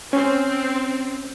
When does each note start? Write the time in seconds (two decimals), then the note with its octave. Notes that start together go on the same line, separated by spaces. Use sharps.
0.13 C4 C#4